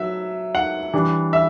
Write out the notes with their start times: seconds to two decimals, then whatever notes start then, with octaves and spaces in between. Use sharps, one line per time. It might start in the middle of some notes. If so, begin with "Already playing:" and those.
Already playing: F#3 E5
0.55 F#5
0.94 E3 G3 D4
1.33 E5